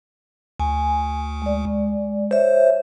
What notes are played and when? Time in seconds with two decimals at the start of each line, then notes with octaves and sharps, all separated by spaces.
0.60 D2 G#5
1.42 G#3 D5
2.31 C5 C#5 E5